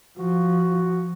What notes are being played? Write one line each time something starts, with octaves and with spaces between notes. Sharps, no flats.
F3 F#4